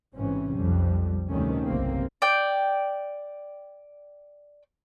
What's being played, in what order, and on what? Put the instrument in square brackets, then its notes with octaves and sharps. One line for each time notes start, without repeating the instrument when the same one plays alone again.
[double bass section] A1 G#2 C3 E3 C#4
B1 F2 G3
D2 C3 D#3 G3 A3 C#4
F#1 B1 C3 A#3 C4
[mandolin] D5 G5